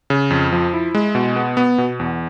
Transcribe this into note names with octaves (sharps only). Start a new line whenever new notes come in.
C#3
F2
F3
E4
G#3
B2
B3
B3
B2
E2